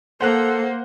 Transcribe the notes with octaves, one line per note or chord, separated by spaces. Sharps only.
A#3 A4 C5 F#5 F#6